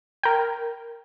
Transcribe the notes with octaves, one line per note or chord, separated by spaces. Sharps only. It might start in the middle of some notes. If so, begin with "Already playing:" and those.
A#4 G5